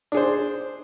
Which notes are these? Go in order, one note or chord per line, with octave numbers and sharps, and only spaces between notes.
D4 G#4 C5